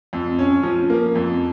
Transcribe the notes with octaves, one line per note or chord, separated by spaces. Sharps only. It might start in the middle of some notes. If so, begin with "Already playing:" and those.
F2
C#4
F3
A#3
F2